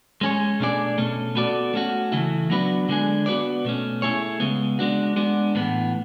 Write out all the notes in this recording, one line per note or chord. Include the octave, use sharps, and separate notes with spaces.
G#3 C#4 G#4 C#5
B2 A3 D4 G#4 D5
B2 A3 C#4
B3 F#4 A4 D5
A3 C#4 F#4
C#3 E3 A3 E4
F#3 B3 D4 F#4 B4
D3 G#3 D4 G#4
B3 F#4 B4 D5
B2 A3 C#4
A3 E4 G#4 C#5
C#3 G#3 B3
G#3 D4 F#4
G#3 B3 D4
A2 E3 B3